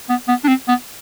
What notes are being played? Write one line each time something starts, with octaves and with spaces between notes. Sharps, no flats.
B3
B3
D4
C4
B3